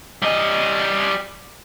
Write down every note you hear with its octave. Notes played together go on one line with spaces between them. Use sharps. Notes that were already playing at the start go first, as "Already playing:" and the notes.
G3 D#5